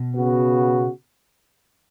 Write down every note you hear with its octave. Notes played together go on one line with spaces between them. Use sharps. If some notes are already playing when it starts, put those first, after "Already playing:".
Already playing: B2
C#3 B3 F#4